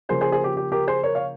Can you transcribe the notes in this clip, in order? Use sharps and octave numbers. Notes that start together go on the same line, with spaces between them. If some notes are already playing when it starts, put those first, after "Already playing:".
C#3 F3 A#3 G#4 C5
G#4 C5
G#4 C5
G4
G4
G4 A#4
G#4 C5
A#4 C#5
C#5 F5